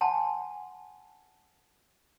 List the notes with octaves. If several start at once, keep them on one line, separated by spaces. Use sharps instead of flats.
F#5 G#5 A5 C6